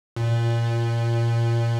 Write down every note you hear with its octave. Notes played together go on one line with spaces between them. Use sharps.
A#2